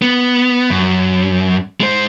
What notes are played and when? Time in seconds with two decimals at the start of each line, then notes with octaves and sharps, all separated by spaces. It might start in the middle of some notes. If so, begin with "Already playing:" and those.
0.02 B3
0.70 F#2
1.80 G#3 C5